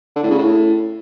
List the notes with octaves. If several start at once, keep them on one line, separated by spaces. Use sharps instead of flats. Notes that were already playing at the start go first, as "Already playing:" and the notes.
D3
A2
C#3
A2